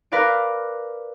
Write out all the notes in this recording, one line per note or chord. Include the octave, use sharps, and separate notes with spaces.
A#4 B4 D5 F5 D7